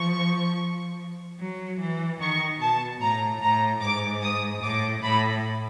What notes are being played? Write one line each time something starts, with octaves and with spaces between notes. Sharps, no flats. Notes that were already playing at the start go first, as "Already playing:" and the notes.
Already playing: F3 C#6
F#3
E3
D#3 C#6
B2 A5
A2 A#5
A2 A#5
G#2 D6
D#6
A2 D6
A2 B5